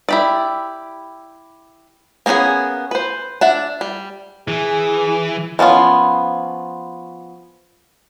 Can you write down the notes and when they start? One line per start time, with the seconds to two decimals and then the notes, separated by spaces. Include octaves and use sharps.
0.09 E4 G4 D5
2.26 A#3 B3 C#4 F#4 G#4
2.91 B4 C5
3.41 D4 E5 F#5
3.81 G3
4.48 E3 G#4
5.59 F3 B3 C#4 F4